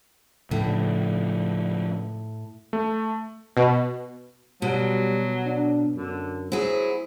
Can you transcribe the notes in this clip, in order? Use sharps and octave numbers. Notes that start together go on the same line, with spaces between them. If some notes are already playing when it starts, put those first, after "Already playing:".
A2 C#3 F3 D4
A3
B2
B2 F#3 G3
D4
F#2 D3
F#3 E4 G#4 C5